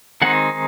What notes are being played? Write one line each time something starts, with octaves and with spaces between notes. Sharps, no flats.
D#3 G#3 C4 D#4 F#5